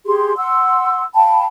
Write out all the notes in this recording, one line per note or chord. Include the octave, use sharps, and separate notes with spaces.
G4 G#4 C6
F#5 C6 E6
F5 G5 A5 B5